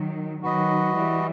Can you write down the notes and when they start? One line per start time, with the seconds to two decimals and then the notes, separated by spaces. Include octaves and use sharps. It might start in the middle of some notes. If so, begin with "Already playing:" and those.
Already playing: D#3 F#3
0.42 D#3 F#3 F#4 B4 D#5
0.95 E3 G3